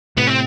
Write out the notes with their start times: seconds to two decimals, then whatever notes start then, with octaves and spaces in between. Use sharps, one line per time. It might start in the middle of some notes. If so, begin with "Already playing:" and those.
0.17 A2 C3 B3
0.27 C4